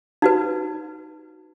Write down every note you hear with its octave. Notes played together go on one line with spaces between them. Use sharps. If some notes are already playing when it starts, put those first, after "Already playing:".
D#4 F#4 B4